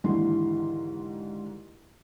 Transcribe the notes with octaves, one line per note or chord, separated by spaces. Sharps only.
D#2 G#2 D3 E3 E4 C6